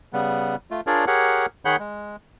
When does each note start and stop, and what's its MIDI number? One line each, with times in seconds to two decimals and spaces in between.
0.13 0.56 49
0.13 0.56 55
0.13 0.56 59
0.71 0.81 57
0.71 0.81 65
0.87 1.05 62
0.87 1.05 65
0.87 1.05 68
0.87 1.05 70
0.87 1.05 73
0.87 1.05 74
1.07 1.46 67
1.07 1.46 68
1.07 1.46 70
1.07 1.46 73
1.07 1.46 78
1.65 1.76 51
1.65 1.76 68
1.65 1.76 73
1.65 1.76 78
1.65 1.76 83
1.65 1.76 91
1.80 2.16 56